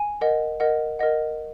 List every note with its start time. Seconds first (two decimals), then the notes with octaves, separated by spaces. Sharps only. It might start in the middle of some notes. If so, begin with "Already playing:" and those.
Already playing: G#5
0.21 A#4 D#5 F#5
0.60 A#4 D#5 F#5
0.99 A#4 D#5 F#5